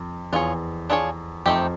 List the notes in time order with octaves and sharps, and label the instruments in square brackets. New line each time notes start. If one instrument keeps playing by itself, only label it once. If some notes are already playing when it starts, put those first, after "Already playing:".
Already playing: [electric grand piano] F2
[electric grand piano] E2 [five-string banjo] D4 F4 G#4 C#5
[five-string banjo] D4 F4 G#4 C#5
[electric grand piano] F2 [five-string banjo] A3 C4 D#4 G4